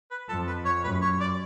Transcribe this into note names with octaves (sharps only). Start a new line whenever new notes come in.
B4
F2 A4
B4
C#5
F#2 B4
C#5
D5